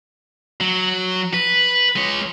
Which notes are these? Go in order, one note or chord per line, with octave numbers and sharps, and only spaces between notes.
F#3
B4
G#3 C#5